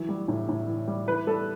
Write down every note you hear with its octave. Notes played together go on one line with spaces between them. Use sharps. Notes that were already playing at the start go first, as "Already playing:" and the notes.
Already playing: E3 F#3
G3
A2
A2
E3
G3
E3 B4
G3 A4